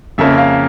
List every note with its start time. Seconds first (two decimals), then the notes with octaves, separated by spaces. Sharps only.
0.18 F2 C#3 F3 A#3 C#4 E5
0.38 F5